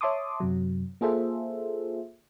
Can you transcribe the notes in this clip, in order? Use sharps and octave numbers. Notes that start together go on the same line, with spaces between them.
C#5 E5 A5 C6 D6 D#6
F#2 C3 F#3
A#3 F4 G#4 A4 C5 E5